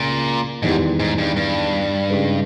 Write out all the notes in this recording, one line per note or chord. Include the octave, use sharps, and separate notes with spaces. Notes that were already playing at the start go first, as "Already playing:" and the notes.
Already playing: C#2 A#2 C#3
E2 G#2 D#3 G3 B3
G#2
G2
G2
C#3 G#3 D#4 G4 B4